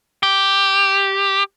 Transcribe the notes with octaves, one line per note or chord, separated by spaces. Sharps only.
G4